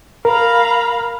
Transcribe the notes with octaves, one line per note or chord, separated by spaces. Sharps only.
A#4 F5 A#5 B5